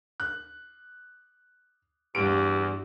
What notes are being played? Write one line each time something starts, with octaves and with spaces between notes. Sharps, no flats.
F#6
E2 G2 G4 D7